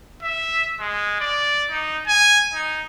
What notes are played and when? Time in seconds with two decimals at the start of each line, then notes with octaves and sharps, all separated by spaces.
0.22 E5
0.80 G#3
1.20 D5
1.71 D#4
2.07 G#5
2.53 D#4